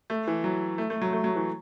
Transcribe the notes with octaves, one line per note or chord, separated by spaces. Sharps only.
A3
E3
F#3
A3
A3
F#3
A3
F#3
E3